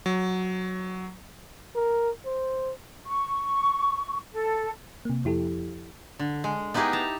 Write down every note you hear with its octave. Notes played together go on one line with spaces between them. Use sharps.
F#3
A#4
C5
C#6
A4
C3 A#3
F2 F3 E4 G4 A4
D3
G#3
B3 D#4 E4 G4 G#4 A#4
A5 A#5